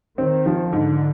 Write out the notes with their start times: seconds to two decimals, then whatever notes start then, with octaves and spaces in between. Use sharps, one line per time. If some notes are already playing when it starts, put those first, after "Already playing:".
0.18 D#3 C4
0.46 F3
0.72 G#2 D3